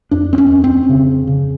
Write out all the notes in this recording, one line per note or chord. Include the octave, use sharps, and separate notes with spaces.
F2 D4
C4
C#4
F2
C4
C#3
C#3